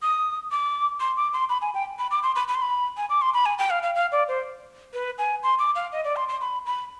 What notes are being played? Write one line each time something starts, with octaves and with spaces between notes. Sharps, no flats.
D#6
D6
C6
D6
C6
B5
G#5
G5
B5
D6
C6
B5
B5
C6
B5
G#5
D6
C6
B5
G#5
G5
F5
F5
F5
D5
C5
B4
G#5
C6
D6
F5
D#5
D5
C6
C6
B5
B5